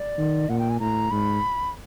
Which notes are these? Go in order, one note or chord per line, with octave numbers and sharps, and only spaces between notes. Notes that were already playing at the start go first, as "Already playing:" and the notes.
Already playing: D5
D#3
A#2 F#5
G5
G#5
A2 A#5
G#2 B5